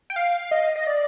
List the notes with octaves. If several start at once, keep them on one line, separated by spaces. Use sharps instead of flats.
G5
F5
D#5
D#5
D5